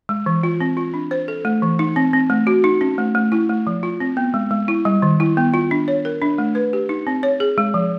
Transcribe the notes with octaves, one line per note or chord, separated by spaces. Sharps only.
G#3
E3
F4
C4
F4
D4
C5
A4
A3
E3
D#4
C4
C4
A3
F#4
D#4
C#4
A3
A3
E4
A3
F3
F4
C4
B3
G#3
G#3
E4
G3
D#3
E4
B3
F4
D4
C#5
A#4
D4
A3
B4
G4
D#4
C4
C#5
G#4
G#3
F3